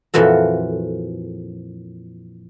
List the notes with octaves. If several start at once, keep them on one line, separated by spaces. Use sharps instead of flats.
F2 A#2 E3 F#4 A4